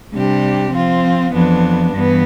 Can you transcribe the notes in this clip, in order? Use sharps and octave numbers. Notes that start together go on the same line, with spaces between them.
C3 G3 D4 G4
F3 C4 F4
F2 E3 B3 D4
G2 E3 B3